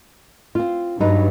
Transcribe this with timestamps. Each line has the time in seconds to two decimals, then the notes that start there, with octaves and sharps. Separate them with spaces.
0.55 C4 F4
1.00 G2 F#3 D#4 B4